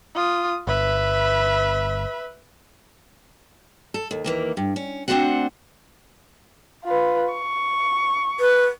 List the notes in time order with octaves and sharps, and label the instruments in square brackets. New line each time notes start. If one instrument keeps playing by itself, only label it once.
[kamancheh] F4 D#6
[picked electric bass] G1 [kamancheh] B4 E5
[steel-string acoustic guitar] A4
D#2
D#2 E3 A#3
G2
C#4
A3 C4 D4 F#4 C5 F#5
[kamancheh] F4 B4
C#6
[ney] B4